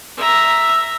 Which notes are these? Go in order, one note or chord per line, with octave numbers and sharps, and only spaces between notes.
E5 A#5